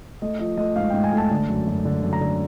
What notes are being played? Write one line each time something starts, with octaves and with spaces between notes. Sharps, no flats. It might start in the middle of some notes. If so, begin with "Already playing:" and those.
A3 D#5
F3 D#5
A3 D#5
G#2 F5
G#2 G5
G#5
A3 A5
D3
F#2
F#2
D3
F#2
A#5
D3